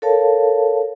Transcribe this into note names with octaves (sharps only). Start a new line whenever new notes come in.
A4 A#4 C#5 F5 A5